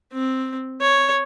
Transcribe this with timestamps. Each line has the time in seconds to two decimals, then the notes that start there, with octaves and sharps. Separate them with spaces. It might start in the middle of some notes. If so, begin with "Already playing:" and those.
0.13 C4
0.81 C#5